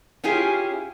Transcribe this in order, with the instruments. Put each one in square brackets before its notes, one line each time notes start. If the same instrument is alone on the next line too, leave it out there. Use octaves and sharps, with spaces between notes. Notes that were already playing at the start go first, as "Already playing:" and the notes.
[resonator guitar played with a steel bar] C#4 E4 F4 G4 G#4